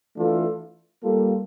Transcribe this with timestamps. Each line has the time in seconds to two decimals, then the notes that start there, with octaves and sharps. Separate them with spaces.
0.16 E3 A3 D4 F4 A4
1.03 G3 A#3 F4 A4